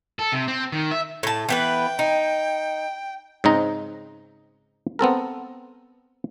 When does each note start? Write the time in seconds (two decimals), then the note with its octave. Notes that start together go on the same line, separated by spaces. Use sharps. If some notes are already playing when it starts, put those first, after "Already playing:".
0.19 A4
0.32 C3
0.48 C4
0.72 D#3
0.91 E5
1.23 A2 A5
1.49 E3 B3 B4 G5
1.99 D#4
3.44 G#2 C#3 C4 D#4 A#5
4.99 B3 C4 A4 A#4